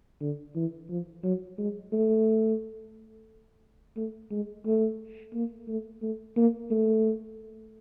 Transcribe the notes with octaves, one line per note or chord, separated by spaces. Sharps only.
D3
E3
F3
F#3
G#3
A3
A3
G#3
A3
A#3
A3
A3
A#3
A3